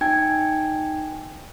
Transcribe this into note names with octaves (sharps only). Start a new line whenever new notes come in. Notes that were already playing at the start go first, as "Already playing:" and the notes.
D#4 G5 G#5 G#6